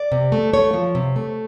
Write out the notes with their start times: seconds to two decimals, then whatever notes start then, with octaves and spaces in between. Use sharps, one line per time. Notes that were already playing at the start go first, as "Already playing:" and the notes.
Already playing: D5
0.12 C3
0.32 A3
0.53 A3 C#5
0.74 F3
0.95 C3
1.16 A3